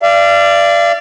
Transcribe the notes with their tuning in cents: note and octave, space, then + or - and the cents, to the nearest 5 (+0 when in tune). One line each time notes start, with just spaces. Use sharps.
D5 +0 F5 -40